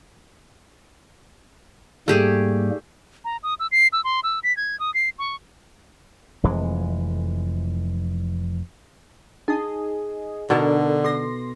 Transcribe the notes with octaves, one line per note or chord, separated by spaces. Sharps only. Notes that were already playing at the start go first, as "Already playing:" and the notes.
G#2 G3 A3 A#3 G4 G#4
A#5
D#6
E6
C7
E6
C6
E6
B6
G#6
D#6
C7
C#6
F1 F2 E3 G#3
D#4 G#4 D#5
B2 D3 D4 D#4 A4 A#4
A4 C6 A#6